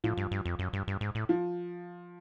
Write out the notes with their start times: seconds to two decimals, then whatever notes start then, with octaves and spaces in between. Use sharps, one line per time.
0.04 A2 F3
0.17 G2
0.31 G2
0.45 F2
0.59 F#2
0.73 G2
0.88 G2
1.01 G#2
1.15 A2
1.29 F3